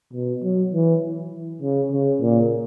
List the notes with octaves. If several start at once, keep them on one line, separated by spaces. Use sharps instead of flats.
B2
F#3
E3
C#3
C#3
A#2